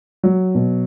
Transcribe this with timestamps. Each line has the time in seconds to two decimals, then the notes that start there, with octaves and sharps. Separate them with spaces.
0.23 F#3
0.55 B2